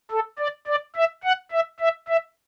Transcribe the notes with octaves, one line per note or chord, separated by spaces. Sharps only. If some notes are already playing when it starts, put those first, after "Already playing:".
A4
D5
D5
E5
F#5
E5
E5
E5